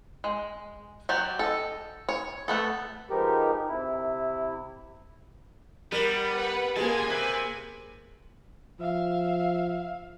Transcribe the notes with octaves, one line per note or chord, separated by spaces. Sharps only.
G#3
F#3 F#4 G4 D5
A4 D#5
C#5
A3 B3 A4
F3 G#3 B3 D#4 G4 A#4
C3 E4
G3 B3 A#4
B4 F#5
C#2 G#3 A#3 G#4 G#5 A5
C3 B4
F3 E5 F5